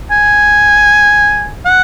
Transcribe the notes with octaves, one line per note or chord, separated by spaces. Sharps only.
G#5
F#5